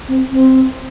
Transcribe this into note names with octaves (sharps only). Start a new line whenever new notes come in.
C4
C4